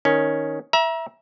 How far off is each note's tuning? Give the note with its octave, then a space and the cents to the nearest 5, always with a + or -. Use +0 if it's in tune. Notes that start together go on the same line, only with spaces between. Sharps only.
D#3 +0 C#4 +0
E5 +0 A#5 +35